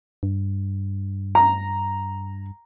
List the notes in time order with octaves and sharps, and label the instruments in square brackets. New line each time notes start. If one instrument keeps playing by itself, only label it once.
[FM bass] G2
[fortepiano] A#5